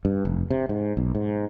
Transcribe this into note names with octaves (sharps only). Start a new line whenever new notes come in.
G2
F1
C3
G#2
B1
G#2